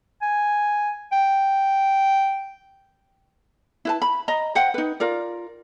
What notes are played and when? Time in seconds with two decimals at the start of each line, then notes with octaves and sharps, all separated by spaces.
0.22 G#5
1.12 G5
3.85 E4 B4 A5
4.02 B5
4.28 D#5 A#5
4.55 C5 E5 F#5 G5
4.74 D#4 B4
5.00 F4 A#4 D5